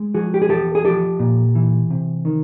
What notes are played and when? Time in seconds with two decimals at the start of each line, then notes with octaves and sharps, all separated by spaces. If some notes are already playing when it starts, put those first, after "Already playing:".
Already playing: G#3
0.14 F3 F#4 G#4
0.34 G4
0.42 G#4
0.49 E2 G4 A4
0.75 G#4
0.84 F3 G4 A4
1.20 A#2
1.55 E3
1.90 C3
2.25 D#3